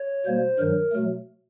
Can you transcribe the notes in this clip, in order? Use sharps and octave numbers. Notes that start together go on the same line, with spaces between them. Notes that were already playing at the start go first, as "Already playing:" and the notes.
Already playing: C#5
B2 G3 A#3 C5
G2 D#3 F#3 A#4
B2 F#3 A3